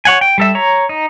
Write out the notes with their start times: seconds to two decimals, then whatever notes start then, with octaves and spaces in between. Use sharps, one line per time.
0.05 C#5 F#5 G#5
0.21 G5
0.38 G3 A4 E5
0.55 C#5 A#5
0.89 D#4